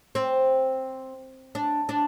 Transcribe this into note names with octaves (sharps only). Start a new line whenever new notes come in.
C4
D4
D4